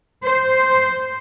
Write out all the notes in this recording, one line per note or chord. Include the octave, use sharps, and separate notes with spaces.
C5